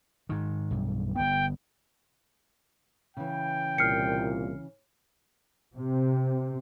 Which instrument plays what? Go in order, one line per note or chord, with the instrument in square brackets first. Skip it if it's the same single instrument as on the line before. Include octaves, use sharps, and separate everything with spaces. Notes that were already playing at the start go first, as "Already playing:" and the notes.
[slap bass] G#2 D#3
B1 G2
[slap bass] G1 B3 [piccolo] G5
[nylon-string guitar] C#3 E3 [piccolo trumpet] G5
[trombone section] C2 A#2 [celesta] F6 C7 C#7
[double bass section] C3